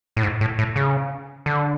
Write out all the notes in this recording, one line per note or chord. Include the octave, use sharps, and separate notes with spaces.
A2
G#2
A2
A2
C#3
D3